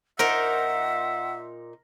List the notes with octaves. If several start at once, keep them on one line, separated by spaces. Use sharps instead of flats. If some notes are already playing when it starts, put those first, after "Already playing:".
A#2 D#4 A#4 C5 E5 F#5